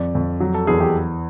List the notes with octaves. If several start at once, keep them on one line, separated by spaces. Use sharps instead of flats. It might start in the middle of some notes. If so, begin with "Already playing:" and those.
Already playing: F2 D5
F2
F#3
A4
E2 G#4
G4